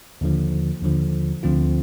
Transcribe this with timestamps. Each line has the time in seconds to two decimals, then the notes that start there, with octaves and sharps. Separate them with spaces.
0.21 D#2 D3 F3
0.82 D#2 D3 F3
1.43 D2 D3 F3 C4 F4